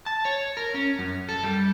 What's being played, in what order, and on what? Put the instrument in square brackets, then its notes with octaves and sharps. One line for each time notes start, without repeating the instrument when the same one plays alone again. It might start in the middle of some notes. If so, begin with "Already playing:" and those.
[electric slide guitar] A5
C#5
A#4
C#4
F#2
A4
G3